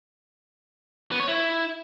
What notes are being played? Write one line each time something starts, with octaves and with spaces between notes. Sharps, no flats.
B3
C#5
E4